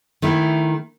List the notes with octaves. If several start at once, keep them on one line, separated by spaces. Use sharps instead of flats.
D#3 A3 E4